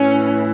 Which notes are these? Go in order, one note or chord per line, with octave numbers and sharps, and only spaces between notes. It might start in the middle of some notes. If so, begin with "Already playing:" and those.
Already playing: A2 E3 C#4